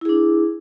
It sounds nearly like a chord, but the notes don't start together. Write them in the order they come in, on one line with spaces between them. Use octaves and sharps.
E4 G#4 D4